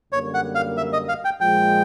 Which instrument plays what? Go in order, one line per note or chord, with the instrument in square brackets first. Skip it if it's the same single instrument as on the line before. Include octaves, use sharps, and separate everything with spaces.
[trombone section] F#2 D3 G3 A#3 [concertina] C#5
[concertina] F#5
F5
E5
D#5
F5
G5
[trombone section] A#2 F3 G#3 [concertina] G5